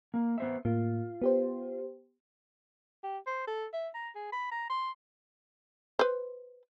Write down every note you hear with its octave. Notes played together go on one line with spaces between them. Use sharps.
A#3
B3 C5 E5
A2 A#3 F4
B3 G4 C5
G4
C5
A4
E5
A#5
G#4
B5
A#5
C6
B4 C5